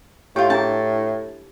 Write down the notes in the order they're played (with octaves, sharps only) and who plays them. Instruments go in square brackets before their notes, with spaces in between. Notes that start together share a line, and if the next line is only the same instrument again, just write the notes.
[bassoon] A2 [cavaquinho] F4 G5 [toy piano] G4
[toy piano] D4 E4 G#4 [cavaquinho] A5